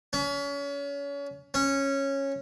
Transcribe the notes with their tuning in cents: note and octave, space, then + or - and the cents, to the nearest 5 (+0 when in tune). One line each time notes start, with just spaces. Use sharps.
C#4 +35
C#4 -10